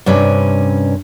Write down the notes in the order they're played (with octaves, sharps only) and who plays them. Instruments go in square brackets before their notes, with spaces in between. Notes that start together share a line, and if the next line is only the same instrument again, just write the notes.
[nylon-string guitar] G2 C3 C#4 B4 D5